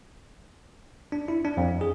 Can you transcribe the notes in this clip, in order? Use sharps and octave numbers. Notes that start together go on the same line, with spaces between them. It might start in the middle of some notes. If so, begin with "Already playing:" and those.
D4
E4
D4
F2
G#4